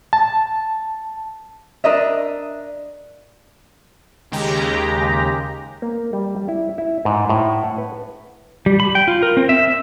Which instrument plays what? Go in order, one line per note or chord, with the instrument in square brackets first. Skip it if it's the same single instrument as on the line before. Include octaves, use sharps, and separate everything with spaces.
[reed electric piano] A5
[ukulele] D4 A#4 D#5 E5
[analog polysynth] D#2 C#3 G#3 G4 A#5
[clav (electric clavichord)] A#3
G3
G3
E4
E4
G#2
A2
F#5
B4
[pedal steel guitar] G3
B5
G5
F4
A#4
C4
E5
E5